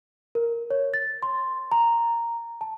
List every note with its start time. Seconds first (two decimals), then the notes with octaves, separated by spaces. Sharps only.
0.35 A#4
0.71 C#5
0.94 A6
1.23 C6
1.72 A#5
2.61 A5